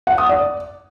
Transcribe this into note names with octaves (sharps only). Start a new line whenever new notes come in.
F#5
D#6
D5